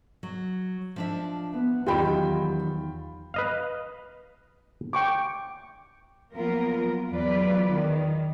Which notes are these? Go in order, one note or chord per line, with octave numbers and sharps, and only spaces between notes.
F#3
F3 D4 E5
B3
E2 D#3 F#3 F4 G4 G5 B5
B4 D#5 F5
G5 C#6 D6
F3 F#3 A#3 B3 F4 A#4
E2 F#3 F4 B4 D5
D#3